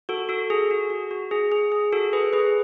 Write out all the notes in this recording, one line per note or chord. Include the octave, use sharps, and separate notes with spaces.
F#4 A4
F#4 A4
G#4
F#4
F#4
F#4
G#4
G#4
G#4
F#4 A4
G#4 B4
G#4 B4